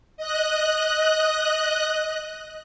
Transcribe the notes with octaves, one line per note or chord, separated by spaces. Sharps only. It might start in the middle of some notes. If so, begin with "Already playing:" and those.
D#5 F#6